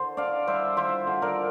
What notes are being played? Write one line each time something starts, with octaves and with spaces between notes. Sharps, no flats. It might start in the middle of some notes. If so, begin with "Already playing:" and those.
Already playing: D3 C5
D4 D5 F5
G3 C5 E5
F4 C5 E5
D3
A#4 D5